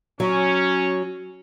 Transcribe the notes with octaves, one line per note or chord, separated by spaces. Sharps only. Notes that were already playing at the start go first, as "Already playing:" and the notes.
F#3 C#4